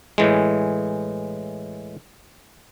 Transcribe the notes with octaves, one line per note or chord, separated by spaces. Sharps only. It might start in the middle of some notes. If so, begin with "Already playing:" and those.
A2 E3 G#3